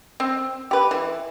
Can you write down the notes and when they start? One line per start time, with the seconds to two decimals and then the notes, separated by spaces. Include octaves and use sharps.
0.20 C4
0.71 G4 B4
0.91 E3